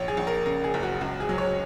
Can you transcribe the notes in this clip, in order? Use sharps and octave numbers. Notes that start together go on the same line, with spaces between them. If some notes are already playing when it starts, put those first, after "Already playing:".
Already playing: A#1 C#5
G#4
A#1
A#4
C#3 A#4
G#4
F#1
F#4
C#2 F#4
G#4
F#3
C#5